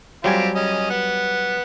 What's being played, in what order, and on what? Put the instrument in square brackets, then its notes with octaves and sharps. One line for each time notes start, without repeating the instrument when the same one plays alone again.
[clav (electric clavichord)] F#3 G3 G#5 [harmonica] C4 F4 G4
[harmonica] C#4 D#5
B3 F#5